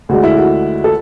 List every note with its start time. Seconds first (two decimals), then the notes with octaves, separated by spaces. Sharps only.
0.09 D2 D3 G#3 F#4
0.24 E4
0.37 F#4
0.84 A4